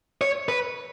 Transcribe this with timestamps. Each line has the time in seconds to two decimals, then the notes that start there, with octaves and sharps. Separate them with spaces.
0.21 C#5
0.49 B4